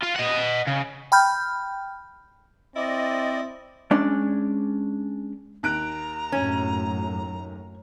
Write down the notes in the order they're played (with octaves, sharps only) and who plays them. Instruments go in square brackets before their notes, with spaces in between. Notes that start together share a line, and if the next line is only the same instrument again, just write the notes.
[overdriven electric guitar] F4
D#5 F#5
C#3
[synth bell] G5 B5 F6 G6
[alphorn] C4 [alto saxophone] E4 [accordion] D5 D#5
[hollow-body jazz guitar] G#3 C#4 D4 D5
[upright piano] D#2 F#6 D7 [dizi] A#5
[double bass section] F#2 A2 [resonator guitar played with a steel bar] C#4